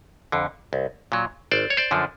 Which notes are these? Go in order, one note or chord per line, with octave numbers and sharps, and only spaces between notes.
F2 D3
C2
A#2 F#3
G#1 C5 D5
C#5
C5 D5
F#2 D3 F3